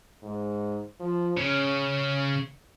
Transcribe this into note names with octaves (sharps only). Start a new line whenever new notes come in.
G#2
F3
C#3 C#4